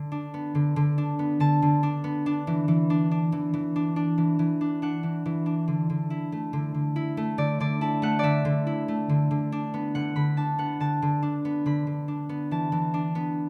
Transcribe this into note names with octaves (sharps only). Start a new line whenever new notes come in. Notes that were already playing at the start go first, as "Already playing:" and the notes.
Already playing: D3
D4
B3
D3
D3
D4
B3
D3 A5
D3
D4
B3
D4
E3
E3
D4
D4
E3
E3
D4
D4
E3
E3
D4
D4 F#5
E3
E3
D4
D3
D3
E4
A3
D3
D3
E4
A3
D3 D5
D3 D5
E4 A5
A3 F#5
D3 D5 E5
D3
E4
A3
D3
D3
D4
B3
D3 F#5
D3 B5
D4 A5
B3 F#5
D3 A5
D3
D4
B3
D3 B5
D3
D4
B3
E3 A5
E3
D4
B3